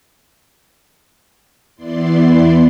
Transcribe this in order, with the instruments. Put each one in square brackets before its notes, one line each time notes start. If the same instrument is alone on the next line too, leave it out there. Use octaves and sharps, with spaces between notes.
[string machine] E2 B3 E4 D5 C6